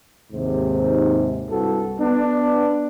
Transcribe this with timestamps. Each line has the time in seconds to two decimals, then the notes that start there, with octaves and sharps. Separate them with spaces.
0.31 D#2 G#2 C3
1.49 C2 G2 F#4 A4
1.98 B3 D4